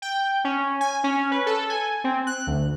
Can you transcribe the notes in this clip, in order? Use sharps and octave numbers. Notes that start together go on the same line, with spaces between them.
G5
C#4
G#5
C#4
B4
A4
G#5
C4
F#6
D2